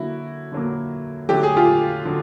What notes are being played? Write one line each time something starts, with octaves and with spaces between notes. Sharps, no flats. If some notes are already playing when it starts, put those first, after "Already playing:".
Already playing: D3 F#3 A#3 E4 F#4
D3 F#3 A#3
D3 F#3 A3 G4
G#4
F4 G4
D3 F#3